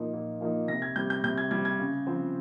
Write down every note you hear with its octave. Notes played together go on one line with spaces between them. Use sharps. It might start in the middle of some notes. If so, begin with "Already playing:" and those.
Already playing: A#2 F3 A#3 D#4
A#2
F3 A#3 D#4
C3 A#6
G#6
G3 C4 G6
G6
C3 G6
G#6
G3 C4 G#6
G#6
C#3
F3 C4